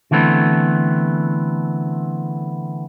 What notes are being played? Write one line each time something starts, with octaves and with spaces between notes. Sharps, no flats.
D3 E3 A3 B3 C4